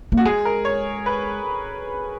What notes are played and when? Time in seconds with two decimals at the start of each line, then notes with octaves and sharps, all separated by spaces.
0.12 A#3
0.17 F#4
0.25 G#3 G#4
0.45 A#4
0.65 C#5
1.06 B4